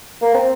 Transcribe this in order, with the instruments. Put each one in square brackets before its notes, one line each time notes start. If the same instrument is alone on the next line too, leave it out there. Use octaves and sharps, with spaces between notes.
[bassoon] A#3
C4